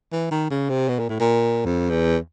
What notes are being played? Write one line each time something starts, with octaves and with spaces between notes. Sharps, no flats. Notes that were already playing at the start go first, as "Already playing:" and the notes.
E3
D#3
C#3
C3
B2
A#2
A2
A#2
F2
E2